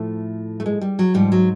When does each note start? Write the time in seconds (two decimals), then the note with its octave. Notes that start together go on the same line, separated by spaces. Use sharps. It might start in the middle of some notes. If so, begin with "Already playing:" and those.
Already playing: A2 F3 A3
0.60 A3
0.66 G#3
0.81 G3
0.99 F#3
1.14 G#2 F3 G3
1.32 F#3